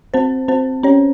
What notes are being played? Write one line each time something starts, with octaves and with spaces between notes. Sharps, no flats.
C4 C5
C4 C5
C#4 C#5